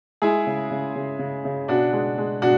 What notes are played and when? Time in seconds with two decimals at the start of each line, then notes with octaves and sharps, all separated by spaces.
0.22 G#3 E4 G#4
0.47 C#3
0.71 C#3
0.96 C#3
1.19 C#3
1.45 C#3
1.68 B2 D4 F#4
1.93 G#3
2.18 G#3
2.42 B2 D4 F#4